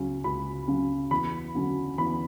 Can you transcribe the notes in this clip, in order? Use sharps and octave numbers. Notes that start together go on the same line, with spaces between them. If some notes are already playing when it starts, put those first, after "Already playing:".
Already playing: C#2 C#3 F#3 C#4
C#2 B5
C#3 F#3 C#4
E2 B5
D3 F#3 C#4
E2 B5